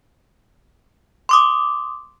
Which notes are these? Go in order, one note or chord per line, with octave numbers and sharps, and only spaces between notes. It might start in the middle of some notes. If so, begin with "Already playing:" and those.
C6 D6 D#6